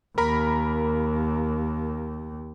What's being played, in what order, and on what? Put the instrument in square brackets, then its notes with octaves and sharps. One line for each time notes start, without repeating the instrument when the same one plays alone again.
[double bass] D#2 [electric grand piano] A#4 A#5 B5